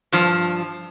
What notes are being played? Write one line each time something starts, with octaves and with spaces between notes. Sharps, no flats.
G2 F3